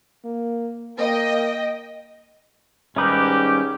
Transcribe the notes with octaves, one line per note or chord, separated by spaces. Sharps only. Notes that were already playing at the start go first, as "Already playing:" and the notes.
A#3
A#3 D#5 G5
G#2 D#3 G3 C#4 D#4 G4 B4